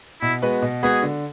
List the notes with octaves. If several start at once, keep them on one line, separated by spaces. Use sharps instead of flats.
B2 E4
G#3 B3 F#4 B4
B2
G#3 B3 F#4 G#4 B4
D3